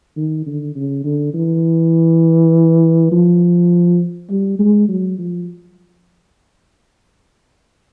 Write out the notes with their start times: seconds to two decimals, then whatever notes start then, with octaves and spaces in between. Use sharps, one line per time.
0.17 D#3
0.46 D3
0.75 C#3
1.04 D3
1.34 E3
3.12 F3
4.30 G3
4.59 G#3
4.88 F#3
5.18 F3